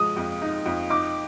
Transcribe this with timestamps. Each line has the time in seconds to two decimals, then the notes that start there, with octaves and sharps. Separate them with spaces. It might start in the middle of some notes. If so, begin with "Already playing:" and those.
Already playing: F3 G#3 D#6
0.17 F2
0.42 D#4
0.66 F2
0.90 D#4 D6